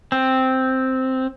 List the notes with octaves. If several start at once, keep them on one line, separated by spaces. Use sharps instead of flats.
C4